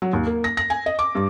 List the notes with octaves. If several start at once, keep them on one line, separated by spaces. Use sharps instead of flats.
F#3
D#2
A#3
A#6
A#6
G#5
D#5
D6
G2